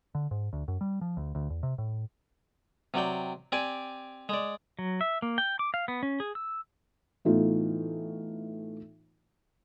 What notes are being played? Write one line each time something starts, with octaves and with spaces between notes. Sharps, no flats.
D3
G#2
D2
F#2
G3
F3
D2
D2
E2
C3
A2
C3 F#3 D5 G5
C4 G4 D5 G#5
G#3 D5
F#3
E5
A#3
G5
D6
F5
B3
C#4
G#4
E6
A2 E3 A3 B3 D#4 F4